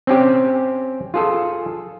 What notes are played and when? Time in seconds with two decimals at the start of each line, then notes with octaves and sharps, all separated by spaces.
0.07 C4 C#4 G4
1.14 F4 G#4 A4